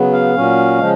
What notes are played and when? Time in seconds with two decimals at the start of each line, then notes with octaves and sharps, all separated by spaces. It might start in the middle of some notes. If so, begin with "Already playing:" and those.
Already playing: C#3 F#3 B3
0.13 F5
0.35 A#2 F#3 C#4
0.78 C#3 F3 G#3